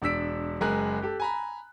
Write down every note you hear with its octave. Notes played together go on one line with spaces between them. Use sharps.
E1 D4 E6 B6 D7
F#1 G#3 A#4 G#5 F#6
G4 A4
G#5 A#5 B5